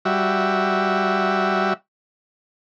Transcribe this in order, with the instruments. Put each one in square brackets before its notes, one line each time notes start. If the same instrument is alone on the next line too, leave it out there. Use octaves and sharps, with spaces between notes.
[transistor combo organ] G3 F#4 E5